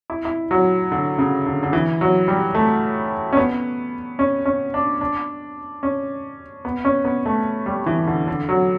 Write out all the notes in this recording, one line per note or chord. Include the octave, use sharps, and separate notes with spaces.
E4
E4
F#3
D3
C#3
D3
D3
E3
F#3
G3
A3
C#4
B3
C#4
C#4
D4
D4
C#4
B3
C#4
B3
A3
G3
E3
D3
D3
F#3